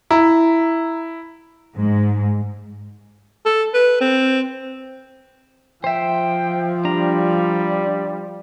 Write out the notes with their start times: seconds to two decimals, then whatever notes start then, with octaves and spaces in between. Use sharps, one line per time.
0.11 E4 A#5
1.76 G#2
3.46 A4
3.74 B4
4.01 C4
5.84 F3 C5 E5 G5
6.85 G3 D4 A#5